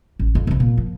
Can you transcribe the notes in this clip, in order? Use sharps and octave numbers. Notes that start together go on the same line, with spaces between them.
A1
F2
C2 C3
A#2
F3